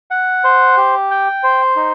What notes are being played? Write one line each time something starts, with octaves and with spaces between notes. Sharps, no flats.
F#5
C5
G4
G5
C5
D#4